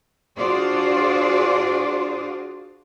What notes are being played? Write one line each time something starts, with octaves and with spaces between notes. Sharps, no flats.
D4 F4 F#4 G#4 C5 D5